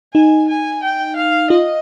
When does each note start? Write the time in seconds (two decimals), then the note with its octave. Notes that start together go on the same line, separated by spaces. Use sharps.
0.14 D#4 G#5
0.49 G#5
0.83 G5
1.17 F5
1.50 F4 D#5